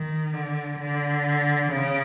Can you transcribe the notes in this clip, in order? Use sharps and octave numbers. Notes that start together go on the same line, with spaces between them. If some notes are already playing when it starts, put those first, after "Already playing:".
Already playing: D#3
D3
D3
C#3